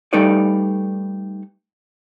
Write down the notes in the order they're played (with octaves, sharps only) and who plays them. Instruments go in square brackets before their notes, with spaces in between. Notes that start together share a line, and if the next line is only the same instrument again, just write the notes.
[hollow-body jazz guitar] G3 A3 D#4 A4 B4 D5